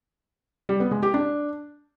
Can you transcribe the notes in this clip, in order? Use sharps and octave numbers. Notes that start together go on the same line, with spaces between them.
G3
B3
G#3
G4
D4